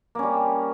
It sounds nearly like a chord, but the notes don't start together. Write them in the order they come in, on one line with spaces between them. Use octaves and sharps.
A#3 C#4 G3